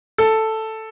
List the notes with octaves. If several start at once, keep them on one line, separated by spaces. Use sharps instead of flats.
A4